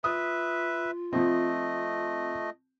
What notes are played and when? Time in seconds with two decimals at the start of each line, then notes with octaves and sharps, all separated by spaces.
0.04 F4 B4 E5 D#6
1.13 F3 A3 C4 D#5